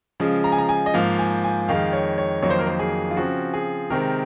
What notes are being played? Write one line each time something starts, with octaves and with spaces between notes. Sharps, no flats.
C#3 F3 G#3
A#5
G#5
A#5
G#5
D#5
G#2 F3 A#3 F5
G#5
G#5
F2 D#3 G#3 F5
C#5
C#5
F2 D#3 F#3 A#3 C#5
C5
A#4
C5
G#4
F4
C#3 F3 C4 F#4
G#4
C3 D#3 G#3 C4 A#4